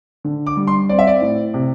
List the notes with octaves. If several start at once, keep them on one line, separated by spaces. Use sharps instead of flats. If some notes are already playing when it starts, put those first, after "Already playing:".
D3
D6
G3
C6
C4 D5
E5
D5
A2
C3